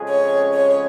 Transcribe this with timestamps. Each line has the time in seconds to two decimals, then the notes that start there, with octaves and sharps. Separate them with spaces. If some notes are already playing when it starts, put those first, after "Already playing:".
Already playing: F2 C#3 G#3 C#4 G#4
0.09 C#5
0.53 C#5